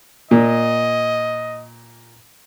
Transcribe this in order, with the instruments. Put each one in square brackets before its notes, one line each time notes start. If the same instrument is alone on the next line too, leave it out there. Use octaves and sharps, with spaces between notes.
[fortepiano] A#2 [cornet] D#5